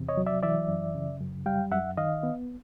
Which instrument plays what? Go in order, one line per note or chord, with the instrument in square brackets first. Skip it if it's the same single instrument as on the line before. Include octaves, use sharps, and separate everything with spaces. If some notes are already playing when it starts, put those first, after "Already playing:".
Already playing: [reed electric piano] E2 C3
C#5 D#5
F#3
D5 E5
E3 D5 E5
F#2
C#3
F#2
G3 F5 G5
F#2 E5 F#5
D#3 D#5 F5
B3